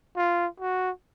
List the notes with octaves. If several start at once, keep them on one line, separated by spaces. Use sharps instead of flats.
F4
F#4